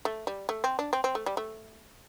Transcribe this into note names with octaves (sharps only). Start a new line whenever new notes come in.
A3
G3
A3
C4
D4
C4
C4
A3
G3
A3